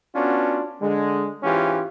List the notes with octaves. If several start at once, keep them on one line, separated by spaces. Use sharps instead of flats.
B3 C#4 D4 F4 F#4
D3 G#3
G#2 E3 C#4 F4 G4